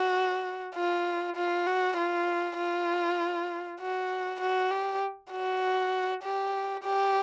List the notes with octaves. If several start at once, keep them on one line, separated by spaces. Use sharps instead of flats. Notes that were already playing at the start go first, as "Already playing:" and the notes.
Already playing: F#4
F4
F4
F#4
F4
F4
F#4
F#4
G4
F#4
G4
G4